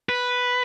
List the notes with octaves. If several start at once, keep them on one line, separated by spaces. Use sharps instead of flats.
B4